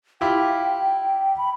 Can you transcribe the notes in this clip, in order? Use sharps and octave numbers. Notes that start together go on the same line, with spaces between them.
E4 F4 G4 G5
B5